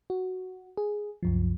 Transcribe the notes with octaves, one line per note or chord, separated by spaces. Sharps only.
F#4
G#4
C2 F#2 F3